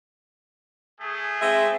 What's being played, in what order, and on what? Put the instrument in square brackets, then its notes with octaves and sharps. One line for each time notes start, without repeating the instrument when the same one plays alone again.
[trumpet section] A3 G#4
[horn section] G#3 C4 E5